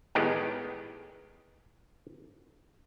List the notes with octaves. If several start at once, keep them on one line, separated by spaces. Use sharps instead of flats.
A2 D#3 G#3 B3 G4